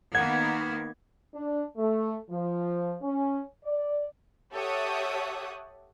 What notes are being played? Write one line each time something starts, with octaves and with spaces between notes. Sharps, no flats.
D#3 A#3 B3 F#5 G#6
D4
A3
F3
C#4
D5
G4 A4 C#5 E5 F#5 D#6